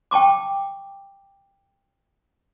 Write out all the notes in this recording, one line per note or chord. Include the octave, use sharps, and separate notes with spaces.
G5 A5 C#6 D6